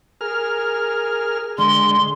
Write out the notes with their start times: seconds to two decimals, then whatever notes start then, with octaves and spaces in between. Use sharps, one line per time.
0.21 G#4 A#4 F6
1.58 D3 G#3 C6